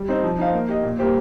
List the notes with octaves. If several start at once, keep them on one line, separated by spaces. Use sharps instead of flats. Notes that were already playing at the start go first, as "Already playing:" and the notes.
Already playing: G3
C4 D#4 C5
F3
D#4 C5 F5
A#3
G4 D#5
A#2
G3 A#3 G4 C5